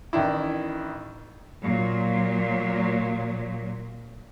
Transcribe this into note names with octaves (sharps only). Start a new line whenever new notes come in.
A1 D#3 D4 E4
A#2 F#3